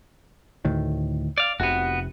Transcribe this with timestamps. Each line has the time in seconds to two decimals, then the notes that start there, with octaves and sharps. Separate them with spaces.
0.65 D2 A2 D#3
1.38 D5 F5
1.60 F1 C3 B3 F#4